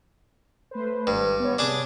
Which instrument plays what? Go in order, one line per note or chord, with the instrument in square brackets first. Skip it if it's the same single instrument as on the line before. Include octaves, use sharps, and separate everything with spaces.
[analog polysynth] A3 B4 C5
[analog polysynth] G#1 [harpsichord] G2
[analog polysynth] B3 C#5
[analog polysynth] C3 [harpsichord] D4 G#4 D6